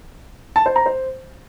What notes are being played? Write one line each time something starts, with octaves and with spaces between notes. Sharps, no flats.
A5
C5
A#5
C5